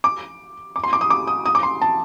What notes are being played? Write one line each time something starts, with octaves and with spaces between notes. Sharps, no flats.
D6
D6
C6
D6
D#6
D6
D#6
D#6
D6
C6
A5